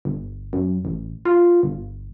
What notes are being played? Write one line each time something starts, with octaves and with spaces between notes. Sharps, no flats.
G1
F#2
A1
F4
G1